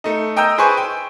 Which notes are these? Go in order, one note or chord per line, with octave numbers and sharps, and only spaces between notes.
A3 D#4
D#5 G5 A#5 D#6 E6 G6
G#4 B4 C5 G#5 C6 C#6
G5